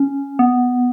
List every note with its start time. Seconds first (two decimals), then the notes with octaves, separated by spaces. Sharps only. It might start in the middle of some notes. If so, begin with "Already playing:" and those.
Already playing: C#4
0.39 B3